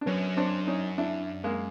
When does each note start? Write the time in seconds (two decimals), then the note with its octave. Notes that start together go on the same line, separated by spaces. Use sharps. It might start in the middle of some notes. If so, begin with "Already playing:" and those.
0.01 D4
0.06 F#2 B3 C#4
0.37 C4 D4
0.67 C#4 D#4
0.98 D4 E4
1.44 G#3 A#3